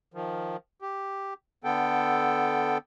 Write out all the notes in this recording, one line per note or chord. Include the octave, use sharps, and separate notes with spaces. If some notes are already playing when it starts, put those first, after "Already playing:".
D#3 F3
G4
D3 B3 A4 G5